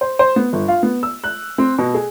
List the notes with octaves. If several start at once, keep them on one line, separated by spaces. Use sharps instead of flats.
C5
C5
B3
G1
F4
B3
E6
F#6
C4
B2
G#4